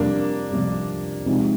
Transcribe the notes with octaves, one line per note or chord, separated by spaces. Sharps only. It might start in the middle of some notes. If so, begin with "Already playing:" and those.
Already playing: F2 C3 G3 A#3 D4
F2 C3 G3
C3 F3 G#3 D#4